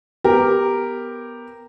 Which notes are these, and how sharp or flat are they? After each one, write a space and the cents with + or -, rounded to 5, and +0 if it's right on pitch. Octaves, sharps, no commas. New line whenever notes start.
B3 +0 G4 +0 A#4 -5